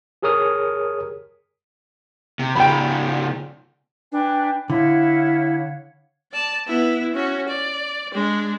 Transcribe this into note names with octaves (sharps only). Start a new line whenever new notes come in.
G4 G#4 A#4 C#5 D#6 F6
C3
C#3 F3 G5 B5
D4 B4 G5 G#5
D3 E4 C#5 F5 F#5
D5 A5
B3 E4
C#4 F#4
D5
G#3 D4